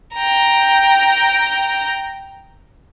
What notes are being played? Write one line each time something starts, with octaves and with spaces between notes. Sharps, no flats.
G5 A#5